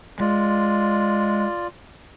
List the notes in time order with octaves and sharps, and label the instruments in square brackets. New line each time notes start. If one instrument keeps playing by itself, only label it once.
[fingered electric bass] G#3 [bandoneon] F4 D5